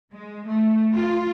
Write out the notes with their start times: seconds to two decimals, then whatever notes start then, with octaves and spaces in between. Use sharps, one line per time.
0.12 G#3
0.47 A3
0.93 F4